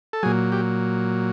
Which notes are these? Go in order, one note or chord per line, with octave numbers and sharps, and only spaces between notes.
A4
A#2 F#3 G#4
G4